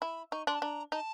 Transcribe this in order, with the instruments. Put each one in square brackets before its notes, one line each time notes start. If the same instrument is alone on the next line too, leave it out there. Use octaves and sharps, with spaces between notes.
[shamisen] E4 [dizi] B5
[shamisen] D#4 [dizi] C#6
[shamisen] D4 [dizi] C6
[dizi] A5
[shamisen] D4 [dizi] A#5
[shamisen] D#4 [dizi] A5